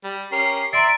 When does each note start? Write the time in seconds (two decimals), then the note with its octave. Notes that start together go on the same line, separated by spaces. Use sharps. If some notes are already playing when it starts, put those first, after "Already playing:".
0.04 G3
0.32 C#4 G4 A#4 C7
0.73 D5 E5 A#5 C6 A6 D7